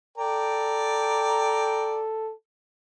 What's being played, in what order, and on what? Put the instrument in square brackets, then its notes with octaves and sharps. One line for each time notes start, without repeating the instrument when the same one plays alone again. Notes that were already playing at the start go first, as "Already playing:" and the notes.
[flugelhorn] A4 [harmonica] D5 G5 A#5